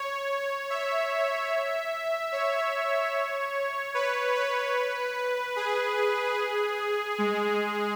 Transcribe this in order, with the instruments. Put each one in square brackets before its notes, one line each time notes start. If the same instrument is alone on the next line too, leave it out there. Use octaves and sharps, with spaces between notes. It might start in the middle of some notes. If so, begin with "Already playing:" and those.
Already playing: [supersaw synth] C#5
E5
C#5
B4
B4
G#4
G#3